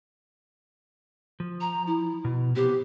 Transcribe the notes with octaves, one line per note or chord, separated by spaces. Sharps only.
F3
A#5
E4
B2
C3 B3 G4 C5